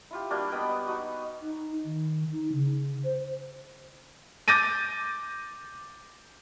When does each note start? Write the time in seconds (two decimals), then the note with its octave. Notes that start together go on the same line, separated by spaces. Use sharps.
0.11 E4 F4 G4
0.30 G3 A#3 D4 F#4
0.52 B3 D#5 G5 B5
0.87 D#4 F#4
1.42 D#4
1.85 D#3
2.32 D#4
2.53 C#3
3.04 C5
4.48 D6 G6 A6 A#6 D#7